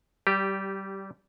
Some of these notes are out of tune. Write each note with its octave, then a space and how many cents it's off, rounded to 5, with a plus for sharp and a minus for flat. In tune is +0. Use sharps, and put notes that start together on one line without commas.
G3 -20 G4 +0